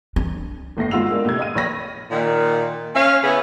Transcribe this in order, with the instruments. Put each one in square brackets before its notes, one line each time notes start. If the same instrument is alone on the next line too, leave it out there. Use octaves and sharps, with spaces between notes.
[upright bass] D4
[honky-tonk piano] G1 A2 A3 A#6 C7
G#2 F4 F#4 E6 F7
G#3 A#3 D4
A2 C3 G#6
D#5 F5 F6 D#7
A#1 C#5 B5 A#6
[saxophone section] A#2 D#3
C#4 F5
C#3 B3 C#4 E4 G#4 B4